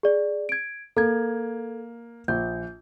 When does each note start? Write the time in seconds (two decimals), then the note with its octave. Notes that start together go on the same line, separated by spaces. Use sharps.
0.03 G#4 D5
0.49 G#6 D7
0.97 A#3 A4 G#6
2.28 A#1 G6